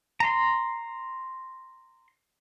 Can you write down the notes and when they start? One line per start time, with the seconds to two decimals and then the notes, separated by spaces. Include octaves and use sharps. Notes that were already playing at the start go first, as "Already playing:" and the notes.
0.20 A#5 C6